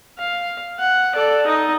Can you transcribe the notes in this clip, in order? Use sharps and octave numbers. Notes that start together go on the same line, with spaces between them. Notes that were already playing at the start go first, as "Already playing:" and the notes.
F5
F#5
A4 D5
D#4 D#5